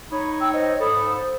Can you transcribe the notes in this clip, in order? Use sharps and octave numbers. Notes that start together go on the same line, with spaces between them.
D#4 C#5 B5
G5 E6
C5 D#5
G#2 A4 B5 D#6
C5